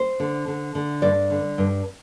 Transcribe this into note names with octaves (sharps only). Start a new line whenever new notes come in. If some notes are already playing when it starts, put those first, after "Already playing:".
Already playing: C5
D3
D3
D3
G2 D5
D3
G2